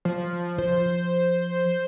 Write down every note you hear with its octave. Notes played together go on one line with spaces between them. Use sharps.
F3
F3 C5